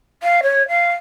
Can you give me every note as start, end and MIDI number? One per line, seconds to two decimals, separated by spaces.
0.22 0.40 77
0.42 0.66 73
0.68 0.91 77